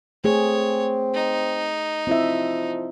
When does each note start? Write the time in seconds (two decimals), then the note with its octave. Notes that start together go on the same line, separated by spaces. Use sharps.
0.24 A3 C4 G#4 C#5
1.14 D#4
2.07 F3 C4 E4 E5